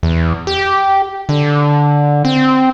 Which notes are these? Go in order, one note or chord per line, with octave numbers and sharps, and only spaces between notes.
E2
G4
D3
C4